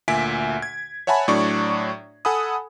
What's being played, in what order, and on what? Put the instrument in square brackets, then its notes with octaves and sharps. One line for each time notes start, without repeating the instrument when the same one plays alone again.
[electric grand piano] D2 A#2 E5 G#5 B6 D7
G#6
C#5 E5 F#5 G#5 A5 B5
A2 F#3 D4 D5 C#6
A4 F#5 G#5 B5 D#6